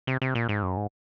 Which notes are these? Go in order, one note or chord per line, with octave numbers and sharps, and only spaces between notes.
C3
C3
A#2
G#2
F#2
G#2